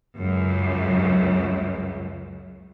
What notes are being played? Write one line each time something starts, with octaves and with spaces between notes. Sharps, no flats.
C#2 F#2